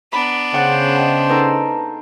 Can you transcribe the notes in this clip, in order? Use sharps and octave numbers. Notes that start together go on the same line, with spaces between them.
B3 D4 B5
C#3 C5 F#5 G5 F#6 A6
D#5 G5 A5
D#4 A4 B4 A5 A#5